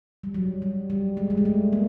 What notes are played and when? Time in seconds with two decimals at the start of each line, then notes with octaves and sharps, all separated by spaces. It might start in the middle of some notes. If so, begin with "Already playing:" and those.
0.24 G3
0.34 F#3
0.62 G3
0.90 G3
1.17 G#3
1.30 G3
1.37 G#3
1.45 A3
1.73 A#3